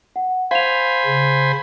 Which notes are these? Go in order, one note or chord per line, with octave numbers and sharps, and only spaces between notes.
F#5
C5 F5 G#5 B5 F7
C#3